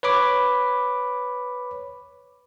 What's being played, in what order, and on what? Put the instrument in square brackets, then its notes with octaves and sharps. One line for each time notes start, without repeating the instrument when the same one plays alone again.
[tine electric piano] B4 C#5 B5 D6